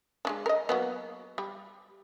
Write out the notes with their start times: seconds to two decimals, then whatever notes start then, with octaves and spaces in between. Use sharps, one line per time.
0.25 G#3 C#4 D4
0.46 A#4 D#5
0.69 F#3 A#3 B3
1.38 G3